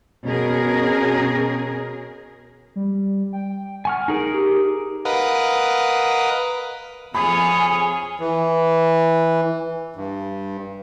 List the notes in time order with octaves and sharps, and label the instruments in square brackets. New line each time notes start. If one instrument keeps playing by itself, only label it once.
[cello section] B2 C#4 G#4 A#4
[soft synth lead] G3
G5
[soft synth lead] F#5 [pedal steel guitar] G#5 C#6 F6
[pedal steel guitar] D#4 G#4 A#4
[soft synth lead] G4
[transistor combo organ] A#4 B4 D#5 F5 F#5
[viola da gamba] F2 F4 C#5 [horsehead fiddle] G#4 [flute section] G#5 [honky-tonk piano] B5
[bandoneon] E3
G2